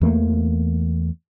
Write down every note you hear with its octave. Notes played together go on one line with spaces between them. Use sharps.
E2 E3 A3 A#3